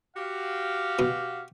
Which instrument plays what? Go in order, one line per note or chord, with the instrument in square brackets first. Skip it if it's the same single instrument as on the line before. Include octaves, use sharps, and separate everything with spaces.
[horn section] F#4 G4 F5
[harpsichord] B2